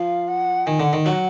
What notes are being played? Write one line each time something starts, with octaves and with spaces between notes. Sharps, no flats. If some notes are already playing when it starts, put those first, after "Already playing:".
Already playing: F3 F5
F#5
D#3 G#5
D3 F#5
D#3
F#3 F#5